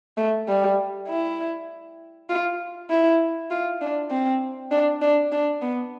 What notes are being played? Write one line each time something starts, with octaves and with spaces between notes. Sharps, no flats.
A3
G3
E4
F4
E4
F4
D4
C4
D4
D4
D4
B3